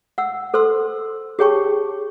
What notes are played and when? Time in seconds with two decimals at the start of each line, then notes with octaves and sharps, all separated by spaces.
0.18 F#5 E6
0.54 A4 C5 C6 E6
1.39 G4 G#4 C#5 G5 A5 C#6